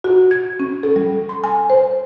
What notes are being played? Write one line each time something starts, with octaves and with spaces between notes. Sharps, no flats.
F#4
G#6
C#4
A4
G3
C6
G#5
C5